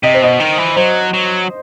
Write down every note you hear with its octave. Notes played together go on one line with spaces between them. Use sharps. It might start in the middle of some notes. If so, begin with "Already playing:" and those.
C3 D#5
C5
B2 D#5
D#3
E3
F#3 C5
F#3